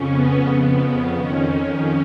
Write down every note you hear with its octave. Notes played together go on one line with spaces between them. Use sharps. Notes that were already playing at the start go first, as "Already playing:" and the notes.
Already playing: F2 C#3 C#4
B3
F2 C#3
F2 D#3 C#4